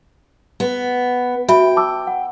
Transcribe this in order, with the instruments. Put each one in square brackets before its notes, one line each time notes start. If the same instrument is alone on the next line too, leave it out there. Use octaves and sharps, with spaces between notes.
[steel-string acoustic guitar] B3
[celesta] F#4 E5 B5 [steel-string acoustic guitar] G5
[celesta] A5 D6 E6
F#5